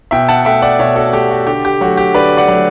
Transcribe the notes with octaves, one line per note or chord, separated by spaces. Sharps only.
B2 E5 G5
F#5 A5
A3 E5 G5
D5 F#5
B2 C#5 E5
F#4 A4
A3 G4
F#4
D3 G4
G4
F#3 A3 F#4
G4
D3 B4 D5
D5 F#5
F#3 A3